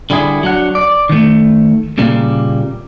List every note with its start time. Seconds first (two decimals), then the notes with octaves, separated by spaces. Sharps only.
0.10 D3 G3 E4 G#4
0.43 F#3 D4 F#5
0.75 D5
1.09 D#3 A3
1.98 A#2 C#3 G3 A#3